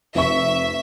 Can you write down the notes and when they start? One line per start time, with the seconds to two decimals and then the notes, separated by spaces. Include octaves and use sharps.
0.15 F1 E5 C#6